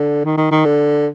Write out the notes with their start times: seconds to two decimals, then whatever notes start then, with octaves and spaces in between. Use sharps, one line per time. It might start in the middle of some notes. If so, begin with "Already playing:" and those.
Already playing: D3
0.25 D#3
0.38 D#3
0.52 D#3
0.65 D3